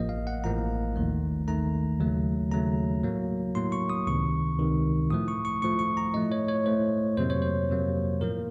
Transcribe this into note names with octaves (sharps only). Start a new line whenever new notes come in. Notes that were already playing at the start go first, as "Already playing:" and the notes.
Already playing: A1 A2 F3 A#3 D#5
F5
F#5
A1 A2 F3 A#3 A#5
D#2 D#3 A3
D#2 D#3 A3 A#5
D#2 C#3 F#3 A3
D#2 C#3 F#3 A3 A#5
A2 F#3 A#3
A2 F#3 A#3 C6
C#6
D#6
C#2 C3 D#3 C#6
C#2 C3 D#3
A2 F3 A3 D#6
C#6
C#6
A2 F3 A3 C#6
C#6
A#5
A2 A3 D#5
C#5
C#5
A2 A3 C5
F2 C3 F#3 A#3 C5
C#5
C5
F2 C3 F#3 A#3
A2 F3 A#3 A#4